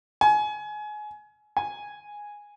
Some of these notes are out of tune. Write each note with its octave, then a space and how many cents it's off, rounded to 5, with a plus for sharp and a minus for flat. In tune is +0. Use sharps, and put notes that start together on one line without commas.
G#5 +25
G#5 -5